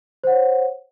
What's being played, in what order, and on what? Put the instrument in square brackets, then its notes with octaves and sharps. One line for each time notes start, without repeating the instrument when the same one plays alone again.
[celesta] C5
F#5
C#5